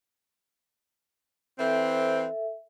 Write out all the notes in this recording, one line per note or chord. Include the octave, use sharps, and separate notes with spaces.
E3 C4 A4 E5